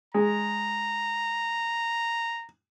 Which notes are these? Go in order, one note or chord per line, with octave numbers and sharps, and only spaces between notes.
G#3 A#5